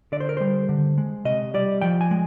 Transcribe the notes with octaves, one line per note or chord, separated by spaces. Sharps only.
D3 D5
C5
A#4
G3 C5
D3
G#3
C3 D#5
G3 D5
F3 G5
G#5
G#3